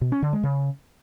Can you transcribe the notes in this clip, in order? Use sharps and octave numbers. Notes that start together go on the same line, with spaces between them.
B2
C#4
D3
G#3
C#3